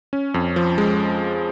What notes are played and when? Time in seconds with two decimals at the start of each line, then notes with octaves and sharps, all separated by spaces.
0.13 C#4
0.34 F2
0.56 F3
0.78 G#3